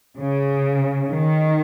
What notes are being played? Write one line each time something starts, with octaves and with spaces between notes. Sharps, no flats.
C#3
D#3